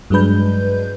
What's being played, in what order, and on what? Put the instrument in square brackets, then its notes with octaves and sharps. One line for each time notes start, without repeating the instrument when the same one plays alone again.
[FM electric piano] G2 F#3 G#3 D4 B4 G6